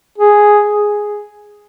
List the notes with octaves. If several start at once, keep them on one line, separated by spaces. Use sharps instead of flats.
G#4